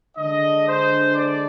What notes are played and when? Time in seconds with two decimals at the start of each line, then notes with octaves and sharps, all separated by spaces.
0.17 D3 G#3 D4 D#5
0.67 C5
1.16 D5